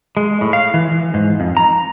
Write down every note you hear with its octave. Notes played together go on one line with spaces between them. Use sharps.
G#3
A2
F5
E3
E3
G#2
F2
A#5